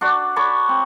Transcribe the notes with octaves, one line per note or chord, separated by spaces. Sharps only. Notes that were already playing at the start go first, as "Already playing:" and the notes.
D4 F#4 D5
C#5 A5 B5 D6
C4